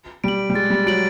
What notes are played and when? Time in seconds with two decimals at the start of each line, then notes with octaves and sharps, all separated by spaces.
0.24 G3 D7 F#7
0.50 G3
0.55 G#3 A6
0.70 G3
0.86 F#3 D7 F#7